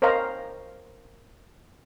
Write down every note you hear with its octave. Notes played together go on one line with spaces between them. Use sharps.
A#4 C5 C#5 D#5 F5 A#5